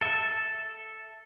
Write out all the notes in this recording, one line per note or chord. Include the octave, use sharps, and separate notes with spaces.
A4 E5